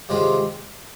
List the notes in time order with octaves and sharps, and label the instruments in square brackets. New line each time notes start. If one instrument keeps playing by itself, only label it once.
[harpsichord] C3 D#3 G#3 C#4 F4